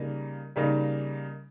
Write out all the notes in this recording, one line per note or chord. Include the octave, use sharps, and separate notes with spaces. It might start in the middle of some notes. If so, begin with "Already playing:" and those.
Already playing: C#3 G3 A#3 D#4
C#3 G3 A#3 D#4